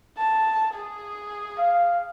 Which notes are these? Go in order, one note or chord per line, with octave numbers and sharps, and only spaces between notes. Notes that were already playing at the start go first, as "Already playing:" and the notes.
A5
G#4
F5